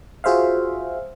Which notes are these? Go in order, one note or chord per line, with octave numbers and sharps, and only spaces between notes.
F4 F#4 G#4 C5 E5 F5